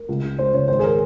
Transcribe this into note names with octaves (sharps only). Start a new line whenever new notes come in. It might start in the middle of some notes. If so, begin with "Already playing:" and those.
Already playing: A#4
C#2
C#2
G#3 C5
C#3 C#5
G#1 C5
G#4
A#4